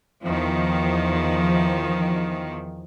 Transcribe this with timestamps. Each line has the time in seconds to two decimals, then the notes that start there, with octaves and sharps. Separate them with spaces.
0.22 E2 D#3 F3